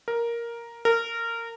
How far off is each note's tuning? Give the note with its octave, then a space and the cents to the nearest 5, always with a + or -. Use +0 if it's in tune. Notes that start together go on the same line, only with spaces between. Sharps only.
A#4 +5
A#4 -20